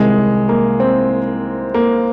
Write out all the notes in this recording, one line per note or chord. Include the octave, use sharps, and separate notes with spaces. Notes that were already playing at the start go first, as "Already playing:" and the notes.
Already playing: C2 C3 D#3 G#3
A#3
C4
A#3